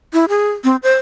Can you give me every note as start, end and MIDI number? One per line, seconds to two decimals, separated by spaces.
0.13 0.25 64
0.29 0.50 68
0.64 0.76 60
0.83 0.96 72